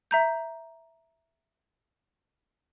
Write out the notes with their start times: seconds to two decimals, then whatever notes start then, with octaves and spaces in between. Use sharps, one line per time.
0.11 E5 A#5 G6